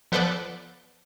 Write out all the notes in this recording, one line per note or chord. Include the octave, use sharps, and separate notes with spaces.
F3 B3 A4 B4 C5 D5